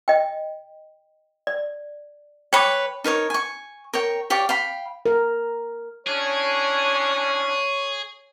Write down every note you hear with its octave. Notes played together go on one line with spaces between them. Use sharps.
D#5 G5
D5
B4 C#5 G5 D6
D#4 A#4 B4 C#5
G#5 C#6
A#4 C#5 G5
G4 C#5 D5 F5
F5 G5 B5
A#4
C#4 D4 E4 G#4 C#5